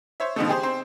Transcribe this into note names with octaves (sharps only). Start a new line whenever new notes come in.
C5 C#5 E5
B2 D3 D#3 F3 G#3 A3
G4 G#4 C5
C4 C5